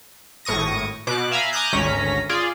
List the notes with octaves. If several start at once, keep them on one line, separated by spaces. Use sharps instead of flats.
G#1 A2 C#6 D#6 A#6
B2 D6 F#6
E5 F5 G#5 A#5 B5
G#5 A#5 D6 D#6 F#6 G6
G#1 D2 C#4 A#5 B6
F4 G#4 D5